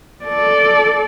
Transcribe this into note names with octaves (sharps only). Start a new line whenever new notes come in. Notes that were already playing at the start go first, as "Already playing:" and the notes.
A4 D5